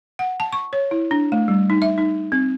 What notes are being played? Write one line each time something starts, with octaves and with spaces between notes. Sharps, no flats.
F#5
A5
C#6
C#5
E4
D4
A3
G3
D#4
E5
D#4
C4